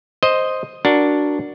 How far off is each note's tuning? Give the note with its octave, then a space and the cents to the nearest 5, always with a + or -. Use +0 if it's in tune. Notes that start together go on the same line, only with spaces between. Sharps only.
C5 +0 D#5 +0
D4 +0 F#4 +0 A#4 +0